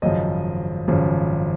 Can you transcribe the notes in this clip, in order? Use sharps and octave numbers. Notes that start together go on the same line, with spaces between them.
G#1 F#2 C#3 F3 D#5
G#1 F#2 C#3 F3